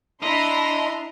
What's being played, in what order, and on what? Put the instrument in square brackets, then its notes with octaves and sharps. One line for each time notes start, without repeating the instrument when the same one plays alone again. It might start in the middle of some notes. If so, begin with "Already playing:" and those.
[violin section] D4 A#5 C6 [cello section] E4 [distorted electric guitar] D#5